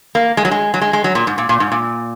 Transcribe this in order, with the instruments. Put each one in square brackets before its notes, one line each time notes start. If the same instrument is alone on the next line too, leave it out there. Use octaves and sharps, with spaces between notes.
[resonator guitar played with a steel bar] A#3
G#3
F#3
G#3
F#3
G#3
G#3
F#3
A#2
G#2
A#2
A#2
G#2
A#2